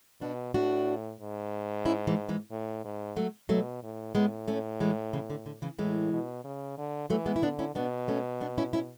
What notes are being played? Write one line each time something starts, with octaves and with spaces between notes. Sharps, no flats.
B2 D4 F#4
A2 D4 F#4
G#2
C#4 E4
E3 G#3
E3 G#3
A2
G#2
F#3 A3
B2 F#3 A3
A2
A2 G#3 B3
A3 C#4
E3 G#3
C#3 E3
D3
D3
C#3 E3
A2 E3 G#3
B2
C#3
D3
E3 F#3 A3
G#3 B3
E4
D3 B3 D4
C#4 E4
B2 B3 D4
A3 C#4
B3 D4
C#4 E4
C#4 E4